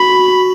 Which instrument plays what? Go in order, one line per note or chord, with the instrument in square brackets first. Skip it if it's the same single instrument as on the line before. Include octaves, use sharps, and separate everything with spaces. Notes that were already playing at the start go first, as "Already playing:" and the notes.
Already playing: [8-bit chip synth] F#4 [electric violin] B5